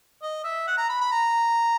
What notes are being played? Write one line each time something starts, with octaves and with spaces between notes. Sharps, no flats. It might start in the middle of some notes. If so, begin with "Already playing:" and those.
D#5
E5
F#5
A#5
B5
B5
A#5